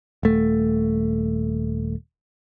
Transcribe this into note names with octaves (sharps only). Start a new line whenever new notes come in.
D#1 A3